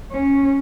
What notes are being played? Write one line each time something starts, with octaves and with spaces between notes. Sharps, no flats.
C#4